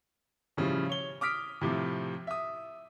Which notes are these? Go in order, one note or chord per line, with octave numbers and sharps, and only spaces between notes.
A2 C#3 F3 G3
C#5 G7
D6 D#6 F6 B6 D7
A2 C3 F3
E5 D#6